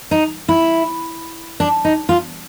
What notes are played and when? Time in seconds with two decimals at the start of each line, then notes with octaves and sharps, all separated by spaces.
0.11 D#4
0.49 E4
1.60 D4
1.85 D#4
2.09 F4